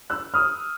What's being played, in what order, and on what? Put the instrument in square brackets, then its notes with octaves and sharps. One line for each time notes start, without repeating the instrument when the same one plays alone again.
[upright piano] E6 F#6
D#6 F6